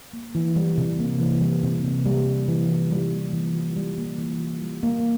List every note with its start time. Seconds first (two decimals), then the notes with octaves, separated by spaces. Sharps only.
0.13 A#3
0.35 E3
0.56 G3
0.78 C3
0.99 A#3
1.20 E3
1.42 G3
1.63 C3
1.84 A#3
2.06 G3
2.27 A#3
2.48 E3
2.70 F4
2.91 G3
3.12 A#3
3.33 E3
3.55 F4
3.77 G3
3.98 A#3
4.18 E3
4.40 F4
4.62 G3
4.83 A#3